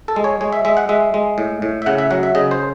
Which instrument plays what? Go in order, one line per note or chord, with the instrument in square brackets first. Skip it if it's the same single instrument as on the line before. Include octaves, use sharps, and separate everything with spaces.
[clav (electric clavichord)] A4
G#3
C#5
G#3 C#5
E5
G#3 E5
F#5
G#3 E5
G#3
A2
A2
E5
C#3 F#5
E5
F#3 F#5
E5
C#3 D#5
C5